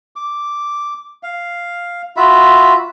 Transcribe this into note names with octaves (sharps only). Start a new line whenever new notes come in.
D6
F5
F4 F#4 E5 B5